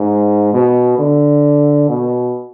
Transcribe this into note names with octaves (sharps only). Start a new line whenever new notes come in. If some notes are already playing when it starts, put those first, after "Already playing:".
Already playing: G#2
B2
D3
B2